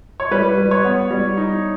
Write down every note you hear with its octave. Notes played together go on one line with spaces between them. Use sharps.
C#5
G3 B4
G3
C#5
B3
G3
D#4